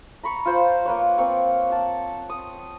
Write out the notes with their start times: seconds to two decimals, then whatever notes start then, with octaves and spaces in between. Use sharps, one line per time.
0.23 A#5 B5 C#6
0.46 F4 C5
0.86 A#3 B4 C#5
1.18 A#3 C4 C#5
1.70 F#5 A5
2.30 D#6